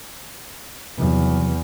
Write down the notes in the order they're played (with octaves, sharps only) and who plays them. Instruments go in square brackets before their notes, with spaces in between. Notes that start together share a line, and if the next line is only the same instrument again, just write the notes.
[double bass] E2 [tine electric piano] C3 F3 F#3